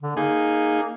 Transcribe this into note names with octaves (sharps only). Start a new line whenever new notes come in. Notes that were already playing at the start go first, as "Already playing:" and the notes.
D3
A#3 D#4 G#4